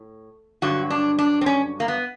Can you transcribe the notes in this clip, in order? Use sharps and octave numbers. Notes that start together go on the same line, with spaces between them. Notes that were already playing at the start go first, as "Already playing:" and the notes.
Already playing: A2
G2 D3 F#3 F#4
D4
D4
C4
C#4
A#3
B3